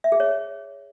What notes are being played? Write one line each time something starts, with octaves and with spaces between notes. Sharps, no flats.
E5
G#4
C#5